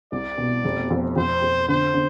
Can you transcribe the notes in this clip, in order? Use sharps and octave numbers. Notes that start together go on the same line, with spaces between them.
C2 D5
B2
F1
F2
F2 C5
F2
D3 C5
D3